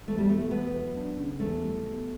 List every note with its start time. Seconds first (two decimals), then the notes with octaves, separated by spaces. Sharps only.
0.08 E2 A3
0.18 G3
0.29 B2 A3
0.40 A3
0.51 E2 B3
0.74 F#3
0.96 D4
1.18 C#3
1.40 E2 A3
1.62 G3
1.83 B2